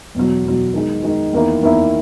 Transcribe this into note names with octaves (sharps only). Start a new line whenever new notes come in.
E2 B2 F#3
E2 B2 F#3
D#3 G#3 D#4
D#3 G#3 D#4
E2 D#3 A#3 E4
E2 D#3 A#3 E4